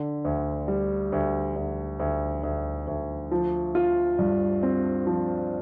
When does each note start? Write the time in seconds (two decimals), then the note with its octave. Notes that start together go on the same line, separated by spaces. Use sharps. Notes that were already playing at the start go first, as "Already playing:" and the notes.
Already playing: D3
0.25 D2
0.68 G3
1.12 D2
1.56 D2
1.99 D2
2.43 D2
2.87 D2
3.32 F3
3.75 F4
4.19 G2
4.63 C4
5.07 F3